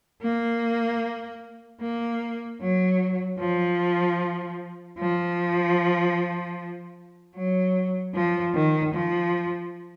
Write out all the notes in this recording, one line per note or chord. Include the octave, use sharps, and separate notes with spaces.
A#3
A#3
F#3
F3
F3
F#3
F3
D#3
F3